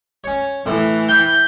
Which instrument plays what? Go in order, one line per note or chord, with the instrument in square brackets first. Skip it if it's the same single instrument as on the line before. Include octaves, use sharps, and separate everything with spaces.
[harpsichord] C#4 C#5
[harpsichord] A2 [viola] E3
[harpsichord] E5 G5 [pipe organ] G6